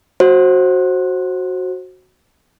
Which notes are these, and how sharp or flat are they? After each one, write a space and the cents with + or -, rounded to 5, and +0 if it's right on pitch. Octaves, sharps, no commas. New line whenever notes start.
F#4 +0 C5 +25